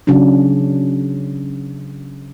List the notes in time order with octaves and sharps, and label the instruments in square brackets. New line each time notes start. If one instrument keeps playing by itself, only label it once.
[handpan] C#3 F#3 C#4 D4